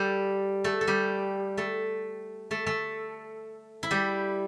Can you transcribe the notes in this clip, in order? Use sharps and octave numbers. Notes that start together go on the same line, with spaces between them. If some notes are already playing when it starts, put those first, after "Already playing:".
Already playing: G3 G4 A4
A3 A4
A4
G3 G4
A3 A4
A3 A4
A3 A4
E4
G3 G4